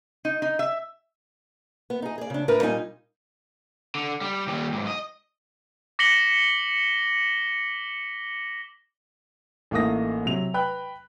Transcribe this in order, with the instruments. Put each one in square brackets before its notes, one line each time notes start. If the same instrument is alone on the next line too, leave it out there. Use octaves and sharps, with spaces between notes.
[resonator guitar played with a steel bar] D#4
D#4
E5
[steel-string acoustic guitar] B3
D#4 G#4
G#4 D5
C#3 D4
A2 D4 E4 A#4 B4
A#2 G3 D#4 G#5
[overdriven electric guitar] D3
G3
D#2 G3
B1 G#2
D#5
[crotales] D6 A#6 B6 C#7 F#7 G7
[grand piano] A1 A3 A#3 D#4 D#6 A#6
C3 F#3 F7
B4 G5 B5 F#6